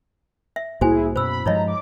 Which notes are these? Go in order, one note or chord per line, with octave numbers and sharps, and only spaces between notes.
E5
C2 A2 A#3 E4 F#4 G#4 C5 G#5
F#2 B2 C5 B5 E6
G2 F3 G#3 D#4 C#5 D#5 A#5
D6